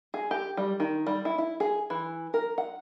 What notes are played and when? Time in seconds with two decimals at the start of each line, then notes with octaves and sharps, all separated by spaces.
0.14 G#4
0.31 G4
0.57 G3
0.80 D#3
1.07 G3
1.25 E4
1.38 E4
1.60 G#4
1.90 E3
2.34 A#4
2.58 F#5